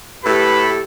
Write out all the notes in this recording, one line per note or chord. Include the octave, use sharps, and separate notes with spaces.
A2 A3 G4 A4 B4 B5